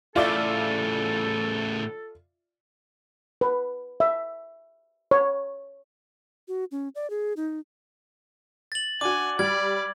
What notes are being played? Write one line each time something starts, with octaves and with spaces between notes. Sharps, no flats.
A2 C#3 F4 A4 D5 E5
B4
E5
C#5
F#4
C#4
D5
G#4
D#4
A6 F#7
D4 F#4 G#5 D6
G3 D5 G#6